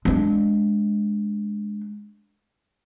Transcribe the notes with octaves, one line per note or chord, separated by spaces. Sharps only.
G#3 D4